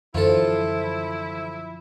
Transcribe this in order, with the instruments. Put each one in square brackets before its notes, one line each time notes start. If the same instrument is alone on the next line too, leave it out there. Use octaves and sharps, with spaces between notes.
[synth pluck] F#2 D3 E3 [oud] F3 [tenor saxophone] E4 [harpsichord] F4 A4